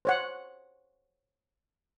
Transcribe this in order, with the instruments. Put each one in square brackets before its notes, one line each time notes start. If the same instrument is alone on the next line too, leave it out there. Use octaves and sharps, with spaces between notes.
[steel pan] C5 C#5 F#5